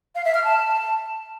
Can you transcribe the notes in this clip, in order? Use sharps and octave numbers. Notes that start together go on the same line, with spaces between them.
F5
E5
F6
A5